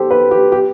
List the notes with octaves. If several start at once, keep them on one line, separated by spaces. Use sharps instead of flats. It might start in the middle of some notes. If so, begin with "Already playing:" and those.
Already playing: G4 A4 C5
B4
G4
G4